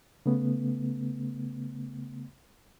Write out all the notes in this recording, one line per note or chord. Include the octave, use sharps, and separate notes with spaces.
C#3 A3 B3